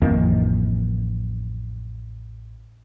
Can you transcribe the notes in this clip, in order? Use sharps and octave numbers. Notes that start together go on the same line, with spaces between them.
A1 F2 D#3 A#3